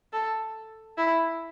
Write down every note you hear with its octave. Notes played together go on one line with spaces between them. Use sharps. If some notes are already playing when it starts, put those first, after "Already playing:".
A4
E4